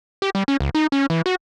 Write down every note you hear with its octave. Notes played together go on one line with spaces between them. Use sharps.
G4
G3
C#4
C#2
D#4
C#4
E3
F#4